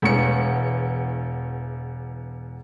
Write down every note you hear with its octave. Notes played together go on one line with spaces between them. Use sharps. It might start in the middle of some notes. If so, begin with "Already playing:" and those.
E1 E2 C#7